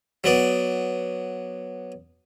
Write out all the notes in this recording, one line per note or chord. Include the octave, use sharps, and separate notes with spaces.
F#3 B3 D5